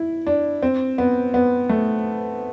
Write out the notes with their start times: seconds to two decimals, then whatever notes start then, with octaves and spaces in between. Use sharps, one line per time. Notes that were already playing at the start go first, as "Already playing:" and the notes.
Already playing: E4
0.27 D4
0.62 C4
0.98 B3
1.34 B3
1.69 A3